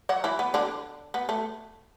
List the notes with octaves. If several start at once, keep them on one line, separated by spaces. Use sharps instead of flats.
F#3 F#4
E3 E4
B3
D3 D4
B3
A3